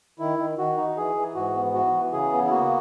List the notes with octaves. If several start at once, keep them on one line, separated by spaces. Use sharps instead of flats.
D#3 E4
D#3
D#3 F#4
D#4
E3 G#4
E3
G#2 F#4
B3
E3 F#4
E3
C#3 G#4
B3
E4
A#3 F#4